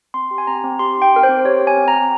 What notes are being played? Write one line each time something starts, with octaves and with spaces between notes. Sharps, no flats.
C4 C6
G4
G#5
C4 A#5
C4
G4 C6
D#4
G5
C4 A#4
C5
C4
G4 C#5
C4
G#5
C4
A#5
C4